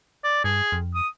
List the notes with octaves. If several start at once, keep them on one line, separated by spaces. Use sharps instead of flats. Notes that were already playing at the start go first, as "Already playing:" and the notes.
D5
G2 G#4
F2
D#6